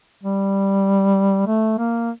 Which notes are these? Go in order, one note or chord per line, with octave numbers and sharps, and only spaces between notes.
G3
A3
A#3